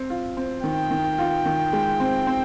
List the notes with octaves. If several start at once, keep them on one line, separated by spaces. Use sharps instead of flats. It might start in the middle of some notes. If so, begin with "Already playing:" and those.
Already playing: C4
F4
C4
D#3 G5
D#3
F4
D#3
G#3
C4
C4